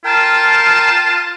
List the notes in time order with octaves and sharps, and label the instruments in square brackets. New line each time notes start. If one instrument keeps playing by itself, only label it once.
[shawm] F4 [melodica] A#4 G5 [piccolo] A5